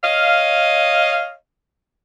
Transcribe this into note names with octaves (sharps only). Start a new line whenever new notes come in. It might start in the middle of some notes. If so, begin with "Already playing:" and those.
C#5 D#5 F5